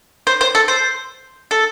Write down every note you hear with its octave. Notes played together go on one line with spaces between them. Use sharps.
C5
C5
A4
C5
A4